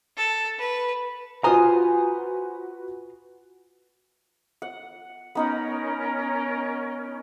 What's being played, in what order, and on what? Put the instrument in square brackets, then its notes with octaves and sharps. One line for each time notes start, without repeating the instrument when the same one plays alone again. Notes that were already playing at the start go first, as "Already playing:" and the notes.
[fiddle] A4
B4
[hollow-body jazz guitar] F4 A#5 [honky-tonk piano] F#4 B4 [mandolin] C5 G#5 D#6
[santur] F#5
[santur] B3 D#4 F#5 [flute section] C#4 A#4